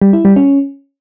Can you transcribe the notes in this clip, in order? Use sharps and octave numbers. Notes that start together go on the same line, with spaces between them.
G3
E4
G3
C#4